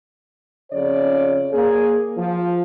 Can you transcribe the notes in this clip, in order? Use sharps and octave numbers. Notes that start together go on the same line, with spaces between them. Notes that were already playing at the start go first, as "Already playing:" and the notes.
F2 C#3 C#5 D5
A#3 G#4
F3